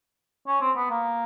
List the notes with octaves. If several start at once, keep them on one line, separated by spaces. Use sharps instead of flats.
C#4
C4
B3
A#3